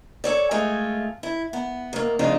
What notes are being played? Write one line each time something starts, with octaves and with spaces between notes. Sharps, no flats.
A4 C#5 D5
G#3 A3 F4 A4
E4
B3
D#2 A#3
F2 A2 C#3 D4 D#4 F4